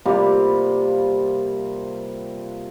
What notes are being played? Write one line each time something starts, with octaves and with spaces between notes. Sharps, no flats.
C3 G3 A#3 F4